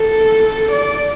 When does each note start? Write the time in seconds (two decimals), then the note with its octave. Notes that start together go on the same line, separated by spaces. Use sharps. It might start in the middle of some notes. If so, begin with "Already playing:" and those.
Already playing: A4
0.72 D5